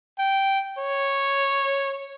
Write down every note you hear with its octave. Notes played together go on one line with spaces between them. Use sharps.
G5
C#5